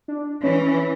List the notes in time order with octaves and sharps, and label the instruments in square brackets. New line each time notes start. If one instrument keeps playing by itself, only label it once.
[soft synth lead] D4
[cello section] E3 [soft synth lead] C#4